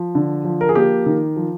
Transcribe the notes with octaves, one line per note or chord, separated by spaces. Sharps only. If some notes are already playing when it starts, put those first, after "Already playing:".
Already playing: F3
D3
F3
A#4
G#4
A#3 G4
D#3
F3